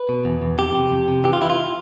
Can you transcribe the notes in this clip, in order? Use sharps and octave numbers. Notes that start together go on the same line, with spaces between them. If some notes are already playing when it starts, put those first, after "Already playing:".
Already playing: B4
B2
E2
E2
F2 G4
C3
F2
C3
E3 G4
F4
E3 E4
F4